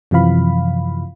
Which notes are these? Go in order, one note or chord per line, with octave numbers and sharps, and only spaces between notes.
F#2 C3 E3 F3 F5 B5